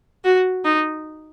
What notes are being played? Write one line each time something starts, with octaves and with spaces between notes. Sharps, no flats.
F#4
D#4